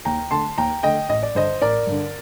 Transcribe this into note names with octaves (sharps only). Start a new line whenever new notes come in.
D#2 G5 A#5
D3 A3 A5 C6
D#2 G5 A#5
D3 A3 D#5 G5
A1 D#5
D5
G2 D3 C5 D#5
A1 A#4 D5
G2 D3